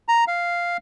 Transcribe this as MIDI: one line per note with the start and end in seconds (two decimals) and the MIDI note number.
0.09 0.24 82
0.28 0.77 77